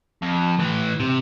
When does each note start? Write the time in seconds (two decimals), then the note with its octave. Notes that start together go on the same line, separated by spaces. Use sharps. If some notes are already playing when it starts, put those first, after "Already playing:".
0.22 F2
0.60 A2 E3
1.00 C3